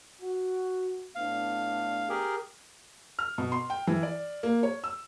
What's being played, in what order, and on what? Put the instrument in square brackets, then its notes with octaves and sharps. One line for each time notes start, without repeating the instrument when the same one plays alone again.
[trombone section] F#4
[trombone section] A2 B3 D4 [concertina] F5
[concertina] G4 G#4 A#4
[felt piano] F6
B2
C6
G5
E3
D5
A#3
C#5
E6